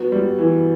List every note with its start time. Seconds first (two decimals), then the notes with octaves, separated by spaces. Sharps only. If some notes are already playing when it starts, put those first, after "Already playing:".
Already playing: F#3 B3
0.12 G3
0.39 E3